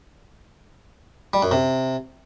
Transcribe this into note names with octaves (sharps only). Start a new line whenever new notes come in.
G3
F#2
C3